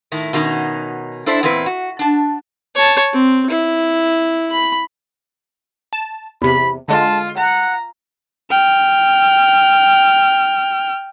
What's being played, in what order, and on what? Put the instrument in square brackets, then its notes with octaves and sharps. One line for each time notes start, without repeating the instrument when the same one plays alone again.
[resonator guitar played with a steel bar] A2 D#3 E4
B2 D#3 G3 A3 C#4 D#4
D4 E4 A4 C5 D5 E5
E2 A#2 C4 E4 B4
F#4
D4 A5
[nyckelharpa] C#5 A5
C4
E4
B5
[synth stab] A5
[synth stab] E2 C3 [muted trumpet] B5
[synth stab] D3 G#3 [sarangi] F4 [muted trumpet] A5
[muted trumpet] F#5 [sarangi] A#5
[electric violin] G5 F6